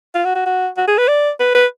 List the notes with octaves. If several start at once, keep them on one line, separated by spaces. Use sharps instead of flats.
F4
F#4
F#4
F#4
F#4
G#4
B4
D5
B4
B4